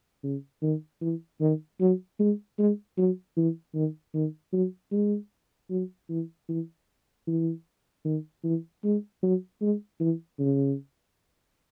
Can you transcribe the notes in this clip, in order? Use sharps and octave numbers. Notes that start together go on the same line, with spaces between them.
C#3
D#3
E3
D#3
F#3
G#3
G#3
F#3
E3
D#3
D#3
F#3
G#3
F#3
E3
E3
E3
D#3
E3
G#3
F#3
G#3
E3
C#3